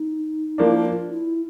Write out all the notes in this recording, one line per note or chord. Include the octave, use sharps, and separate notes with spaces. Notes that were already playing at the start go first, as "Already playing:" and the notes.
Already playing: D#4
F3 A#3 D4 E4
F4
E4